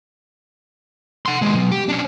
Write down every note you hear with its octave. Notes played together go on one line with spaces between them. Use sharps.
F#5 C6
D#2 G#3
B2 F#3
G4
C#4 D4